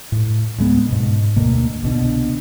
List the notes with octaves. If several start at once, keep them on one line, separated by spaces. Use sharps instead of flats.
A2
D2 G#3 A3 B3
G#2 B2
D2 B2 A#3
C2 B2 D3